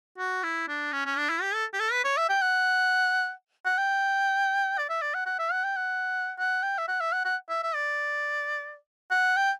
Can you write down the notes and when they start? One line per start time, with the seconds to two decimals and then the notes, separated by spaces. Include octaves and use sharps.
0.18 F#4
0.43 E4
0.68 D4
0.93 C#4
1.06 C#4
1.17 D4
1.30 E4
1.42 G4
1.54 A4
1.73 G4
1.80 A4
1.92 B4
2.04 C#5
2.17 E5
2.29 G5
2.41 F#5
3.65 F#5
3.78 G5
4.78 D5
4.89 E5
5.02 D5
5.14 F#5
5.26 F#5
5.39 E5
5.52 F#5
5.64 G5
5.76 F#5
6.39 F#5
6.63 G5
6.78 E5
6.88 F#5
7.00 E5
7.13 F#5
7.25 F#5
7.50 E5
7.63 E5
7.75 D5
9.11 F#5
9.37 G5